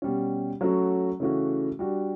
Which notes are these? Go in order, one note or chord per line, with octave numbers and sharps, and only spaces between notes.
B2 G3 C#4
F#3 A3 C#4 F#4
C#3 E3 A3 C#4 F#4
G3 D4 F#4